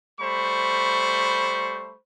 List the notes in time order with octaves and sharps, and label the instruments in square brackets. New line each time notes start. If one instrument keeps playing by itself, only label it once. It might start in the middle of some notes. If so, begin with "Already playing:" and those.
[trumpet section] G3 A3 C5 B5 C#6